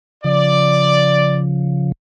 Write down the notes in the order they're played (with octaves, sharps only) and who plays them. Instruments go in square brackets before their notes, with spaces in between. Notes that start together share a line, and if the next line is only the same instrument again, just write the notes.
[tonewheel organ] C#3 F3 [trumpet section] D5